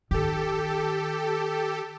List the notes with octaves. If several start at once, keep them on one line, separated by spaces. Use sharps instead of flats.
D#3 G4 A4